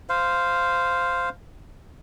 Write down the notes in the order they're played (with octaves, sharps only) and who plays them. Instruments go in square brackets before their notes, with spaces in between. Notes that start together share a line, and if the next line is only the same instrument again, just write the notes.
[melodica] C5 F5